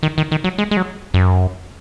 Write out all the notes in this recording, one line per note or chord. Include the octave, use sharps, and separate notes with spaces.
D#3
D#3
D#3
F#3
G#3
G#3
F#3
F#2